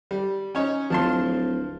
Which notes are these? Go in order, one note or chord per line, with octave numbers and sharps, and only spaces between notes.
G3
C#4 D#4 C#5
D1 F3 A5 C6